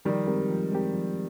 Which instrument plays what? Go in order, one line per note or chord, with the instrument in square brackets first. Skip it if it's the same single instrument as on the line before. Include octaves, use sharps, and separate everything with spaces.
[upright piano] D#3 G3 [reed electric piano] F3
[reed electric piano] G#3 C4 G4 A#4
F3
G#3 C4 G4 A#4
F3